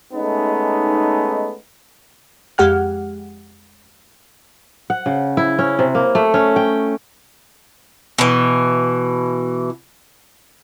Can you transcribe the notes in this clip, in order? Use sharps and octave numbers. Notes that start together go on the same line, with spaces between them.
G#3 A3 B3 C#4 D#4
F2 G#3 G4 F#5 F6
F#5
C#3
E4
C#4
C3
A#3
A3
C#4
G5
B2 E3